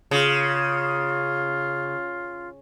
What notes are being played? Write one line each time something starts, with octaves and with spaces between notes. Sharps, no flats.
C#3 F4